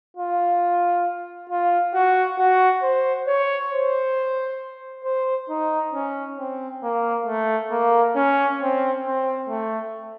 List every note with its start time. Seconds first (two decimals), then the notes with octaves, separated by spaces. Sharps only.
0.17 F4
1.50 F4
1.94 F#4
2.39 F#4
2.83 C5
3.27 C#5
3.72 C5
5.04 C5
5.50 D#4
5.94 C#4
6.38 C4
6.83 A#3
7.26 A3
7.71 A#3
8.16 C#4
8.60 C4
9.05 C4
9.49 A3